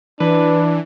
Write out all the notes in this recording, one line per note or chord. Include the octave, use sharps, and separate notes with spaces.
E3 D4 B4